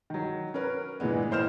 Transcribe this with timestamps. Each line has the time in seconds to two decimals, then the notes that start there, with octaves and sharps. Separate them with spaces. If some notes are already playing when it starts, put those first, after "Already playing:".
0.10 D#3 F#3
0.54 C#4 A#4 B4
1.00 A#2 D3 E3 G#3 B3
1.31 A2 E4 C5 D#5 F6 E7